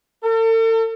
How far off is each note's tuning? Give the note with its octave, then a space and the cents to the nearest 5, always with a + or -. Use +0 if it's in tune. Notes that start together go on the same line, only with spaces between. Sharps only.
A4 +40